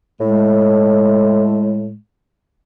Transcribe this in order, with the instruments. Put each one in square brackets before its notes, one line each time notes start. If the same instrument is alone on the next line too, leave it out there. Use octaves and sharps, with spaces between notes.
[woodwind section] A2 G#3